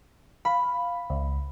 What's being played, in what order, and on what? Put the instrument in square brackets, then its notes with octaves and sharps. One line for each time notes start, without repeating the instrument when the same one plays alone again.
[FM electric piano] F5 [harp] B5
[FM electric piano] C#2